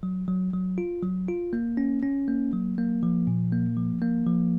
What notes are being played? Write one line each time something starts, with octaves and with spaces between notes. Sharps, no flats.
F#3
F#3
F#3
F4
F#3
F4
A#3
C#4
C#4
A#3
F#3
A#3
F3
A#2
A#3
F3
A#3
F3